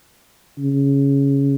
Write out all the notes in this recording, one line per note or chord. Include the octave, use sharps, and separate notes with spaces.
C#3